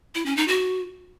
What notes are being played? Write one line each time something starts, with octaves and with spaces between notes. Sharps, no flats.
E4
C#4
D#4
F#4